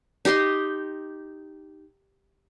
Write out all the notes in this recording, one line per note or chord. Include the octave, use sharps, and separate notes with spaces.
D#4 G4 D#5 C6